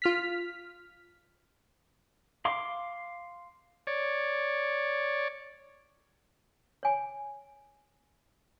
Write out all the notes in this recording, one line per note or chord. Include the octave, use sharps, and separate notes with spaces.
F4 F6 B6
F5 C6 D6
C#5 D5
C#5 G#5